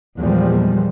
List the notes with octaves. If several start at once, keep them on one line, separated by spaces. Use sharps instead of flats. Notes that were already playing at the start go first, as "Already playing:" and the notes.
E2 A#2 F3 G3 G#3